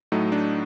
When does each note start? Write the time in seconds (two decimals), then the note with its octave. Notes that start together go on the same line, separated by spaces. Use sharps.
0.12 A2 F#3 A3 D#4
0.32 D4